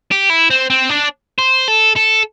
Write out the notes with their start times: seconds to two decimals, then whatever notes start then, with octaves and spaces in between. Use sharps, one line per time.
0.11 G4
0.30 E4
0.50 C4
0.70 C4
0.89 D4
1.39 C5
1.68 A4
1.96 A4